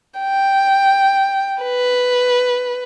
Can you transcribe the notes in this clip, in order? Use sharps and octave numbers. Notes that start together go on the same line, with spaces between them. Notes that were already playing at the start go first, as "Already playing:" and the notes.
G5
B4